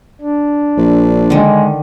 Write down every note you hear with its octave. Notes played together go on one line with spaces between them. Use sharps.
D4
A#1
D3 D#3 G#3